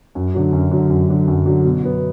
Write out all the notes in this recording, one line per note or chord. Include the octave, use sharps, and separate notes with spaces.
F#2
D3 F#3
F#2
D3 F#3
F#2
D3 F#3
F#2
D3 F#3
B2
F#3 B3